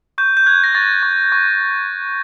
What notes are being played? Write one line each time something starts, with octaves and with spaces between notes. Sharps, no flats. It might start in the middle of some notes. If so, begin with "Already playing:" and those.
C#6 G6
G6
F#6 G#6
A#6
C#6 A6
C#6
C#6